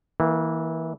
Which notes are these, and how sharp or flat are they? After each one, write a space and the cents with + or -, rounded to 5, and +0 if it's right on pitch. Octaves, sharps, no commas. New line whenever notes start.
E3 -25 A#3 +5